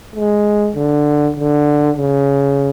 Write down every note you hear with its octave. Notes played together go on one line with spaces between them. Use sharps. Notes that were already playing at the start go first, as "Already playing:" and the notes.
G#3
D3
D3
C#3